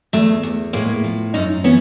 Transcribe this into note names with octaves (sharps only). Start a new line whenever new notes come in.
E2 A3
E2
A2 G#3 A#3
F3
F#2 C#4 D#4
E3 B3 C#4